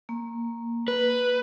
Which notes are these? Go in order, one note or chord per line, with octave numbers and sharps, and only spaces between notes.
A#3
B4